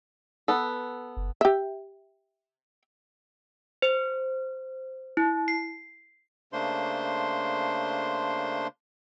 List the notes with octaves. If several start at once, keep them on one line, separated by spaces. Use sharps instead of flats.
B3 A4
F#1
G4 E5
C5
E4
C7
C#3 A3 A#3 D4 C5 C6